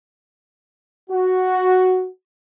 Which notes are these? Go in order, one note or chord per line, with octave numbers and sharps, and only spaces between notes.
F#4